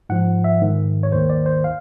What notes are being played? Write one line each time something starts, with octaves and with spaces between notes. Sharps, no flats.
G#2 F3 F#5
E5
G#2 D#3
C#5
D#2 D#3 C5
D5
C5
F5